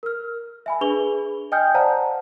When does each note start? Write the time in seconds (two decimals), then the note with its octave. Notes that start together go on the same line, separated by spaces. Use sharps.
0.03 A#4 F6
0.66 E5 G#5 B5
0.81 D4 G#4 B4 C#6 F7 G7
1.52 D#5 G5 G#5 D#6 F6 G6
1.75 C5 D5 F5 F#5 A5 A#5